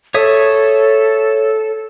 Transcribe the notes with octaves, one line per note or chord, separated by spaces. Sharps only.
A4 C#5 E5 D#6